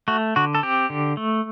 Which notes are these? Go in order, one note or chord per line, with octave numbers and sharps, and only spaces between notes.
A3 F#4
D3 F#4
A4
C4 G4
D3
A3